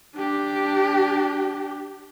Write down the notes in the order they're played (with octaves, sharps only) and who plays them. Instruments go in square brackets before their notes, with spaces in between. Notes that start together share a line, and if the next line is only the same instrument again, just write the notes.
[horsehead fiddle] D4 G4